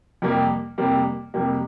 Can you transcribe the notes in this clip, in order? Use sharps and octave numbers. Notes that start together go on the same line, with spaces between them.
F2 C3 G3 A#3
F2 C3 G3 A#3
F2 C3 G3 A#3